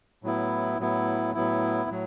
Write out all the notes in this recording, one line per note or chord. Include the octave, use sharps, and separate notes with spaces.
A2 F#3 B3 E4
A2 F#3 B3 E4
A2 F#3 B3 E4
A2 F#3